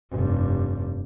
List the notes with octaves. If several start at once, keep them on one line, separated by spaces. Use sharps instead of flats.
F1 G2